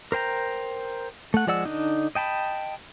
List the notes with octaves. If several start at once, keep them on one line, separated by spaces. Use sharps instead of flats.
A#4 C5 G5 A#5
A3 F#5
F3 G#3 D5 F#5 E6
D3 D4 D#4
D#5 G5 A5 B5